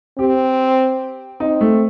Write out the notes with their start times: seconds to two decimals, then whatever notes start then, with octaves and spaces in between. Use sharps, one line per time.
0.18 C4 G4
1.40 C4 D#4
1.61 A3